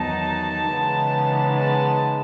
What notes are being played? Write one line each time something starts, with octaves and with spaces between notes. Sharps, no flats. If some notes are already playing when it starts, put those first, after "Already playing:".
Already playing: E2 D#3 F#3 B3 D#4 A5
C#3 E3 G#3 B3 D#4
A5